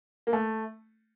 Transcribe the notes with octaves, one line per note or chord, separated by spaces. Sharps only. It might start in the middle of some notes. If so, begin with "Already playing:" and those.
A#3
A3